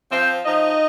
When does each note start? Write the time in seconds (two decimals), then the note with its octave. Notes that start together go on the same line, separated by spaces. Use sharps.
0.10 F3 C4 C5
0.44 F3 D#4 D#5